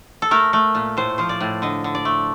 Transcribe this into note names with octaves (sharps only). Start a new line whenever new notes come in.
A4
A3 A#4
A3
A#2
A2 C5
F3 C5
D5
A2
D3 D#5
D3
D5
A3